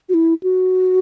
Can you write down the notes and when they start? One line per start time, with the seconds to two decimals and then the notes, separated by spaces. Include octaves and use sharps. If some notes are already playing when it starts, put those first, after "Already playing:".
0.09 F#4
0.14 E4
0.43 F#4